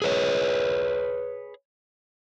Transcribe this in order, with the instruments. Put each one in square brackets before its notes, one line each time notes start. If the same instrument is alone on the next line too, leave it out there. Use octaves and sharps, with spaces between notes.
[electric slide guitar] G#4 B4 C#5